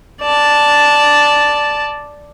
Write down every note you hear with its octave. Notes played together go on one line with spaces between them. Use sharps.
D5 A5